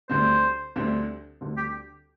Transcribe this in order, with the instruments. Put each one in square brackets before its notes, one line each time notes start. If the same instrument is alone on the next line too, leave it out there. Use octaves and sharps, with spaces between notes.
[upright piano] D2 D3 G3 C4 [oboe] C5
[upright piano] D2 D3 G3 C4
D2 D3 G3 C4
[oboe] G4